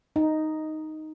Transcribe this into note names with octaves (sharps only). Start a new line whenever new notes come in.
D#4